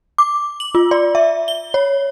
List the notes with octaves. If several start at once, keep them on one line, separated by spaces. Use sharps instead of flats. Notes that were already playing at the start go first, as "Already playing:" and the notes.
D6
F#7
F4
D5
E5
G7
C#5